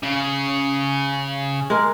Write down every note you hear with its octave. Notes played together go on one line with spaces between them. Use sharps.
C#3
G#3 A#4